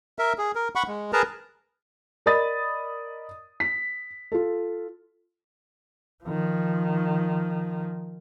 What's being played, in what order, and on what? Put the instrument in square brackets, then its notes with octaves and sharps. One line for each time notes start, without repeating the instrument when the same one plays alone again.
[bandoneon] A#4 E5
G#4
A#4
F#5 B5 C#6
G#3
G#4 A#4 B4 A5 A#5
[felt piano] A#4 D5 D#5 B5 D#6 A6
B6
F4 A4
[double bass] D#3 F3